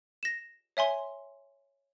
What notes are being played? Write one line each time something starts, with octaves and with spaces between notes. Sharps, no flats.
A#6 E7
C#5 E5 G#5 C6